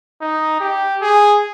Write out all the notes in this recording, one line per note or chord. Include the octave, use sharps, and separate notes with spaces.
D#4
G4
G#4